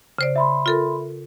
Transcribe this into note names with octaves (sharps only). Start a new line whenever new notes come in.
C#3 C5 D5
E5 B5 C6
F4 A4 A#4